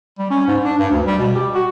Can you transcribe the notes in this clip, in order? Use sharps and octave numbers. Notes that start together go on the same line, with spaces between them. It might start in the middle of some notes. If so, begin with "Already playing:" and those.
G3
C#4
G#2
D4
G2
D2
G3
B2
G4
F#4